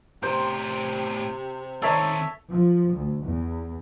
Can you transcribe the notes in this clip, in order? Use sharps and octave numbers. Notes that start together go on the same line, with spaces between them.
A2 C3 G4 A#4 C5
D#3 C4 D#4 A4 C#5 E5
F3
D2
E2